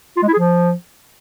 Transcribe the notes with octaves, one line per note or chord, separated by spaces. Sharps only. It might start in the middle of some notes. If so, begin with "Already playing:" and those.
F4
G#3
E4
G#4
F3